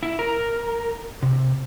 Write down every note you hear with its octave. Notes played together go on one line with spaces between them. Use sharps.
E4
A#4
C3